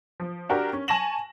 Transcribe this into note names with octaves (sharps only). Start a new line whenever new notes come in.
F3
D4 F#4 G4 A#4
C#4
G#5 A5 C#6 A#6 E7 F#7